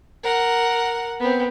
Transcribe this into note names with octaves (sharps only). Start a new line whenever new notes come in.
A#4 F#5
B3 C4